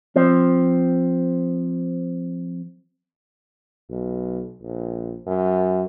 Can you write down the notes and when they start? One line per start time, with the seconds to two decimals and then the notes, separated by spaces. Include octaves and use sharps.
0.16 F3 C4
3.90 B1
4.62 A#1
5.27 F#2